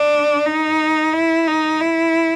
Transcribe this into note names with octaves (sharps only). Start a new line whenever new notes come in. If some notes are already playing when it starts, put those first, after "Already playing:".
Already playing: D4
D#4
E4
D#4
E4